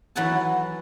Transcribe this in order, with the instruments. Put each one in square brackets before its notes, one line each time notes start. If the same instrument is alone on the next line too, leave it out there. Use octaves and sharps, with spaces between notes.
[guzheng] E3 F#3 F#4 A4 F#5 A5